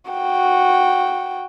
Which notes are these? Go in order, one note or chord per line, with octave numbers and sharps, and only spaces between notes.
F#4 G5